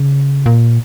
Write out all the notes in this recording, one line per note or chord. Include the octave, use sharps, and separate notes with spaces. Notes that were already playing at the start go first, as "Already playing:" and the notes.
Already playing: C#3
A#2